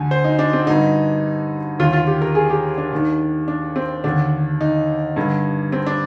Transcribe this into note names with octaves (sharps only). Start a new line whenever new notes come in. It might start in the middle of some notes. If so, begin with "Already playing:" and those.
Already playing: D2 D3 G#5
C5
D#4
D4
C4
G2 D3 D#4
D#2 D3 F4
F4
G4
A#4
G#4
G4
D4
D#2 D#3
D4
C4
D#2 D3 D4
D#4
G2 D3
C4
D4